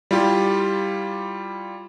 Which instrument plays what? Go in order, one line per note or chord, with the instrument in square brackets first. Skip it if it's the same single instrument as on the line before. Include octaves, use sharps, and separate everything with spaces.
[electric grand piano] G3 E4 F4 G4